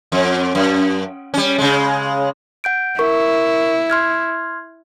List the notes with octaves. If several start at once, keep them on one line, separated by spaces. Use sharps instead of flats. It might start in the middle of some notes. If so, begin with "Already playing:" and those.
F2
F#2
G3 C#4
C#3 G#3
F#5 G6 D7
E4 A#4 C#6
C6 F6 G#6